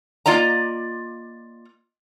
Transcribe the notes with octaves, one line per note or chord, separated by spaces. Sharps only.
A#3 F4 D5 D#5 A#5